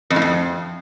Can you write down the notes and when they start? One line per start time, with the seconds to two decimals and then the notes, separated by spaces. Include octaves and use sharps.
0.10 F2
0.16 A2
0.22 F2